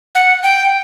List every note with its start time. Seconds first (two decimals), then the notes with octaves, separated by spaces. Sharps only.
0.15 F#5
0.43 G5